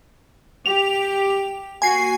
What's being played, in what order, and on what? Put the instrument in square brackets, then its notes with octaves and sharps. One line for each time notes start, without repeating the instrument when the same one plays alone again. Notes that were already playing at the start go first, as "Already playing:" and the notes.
[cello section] G4 [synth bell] F7
[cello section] A#3 F#4 [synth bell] G#5 C7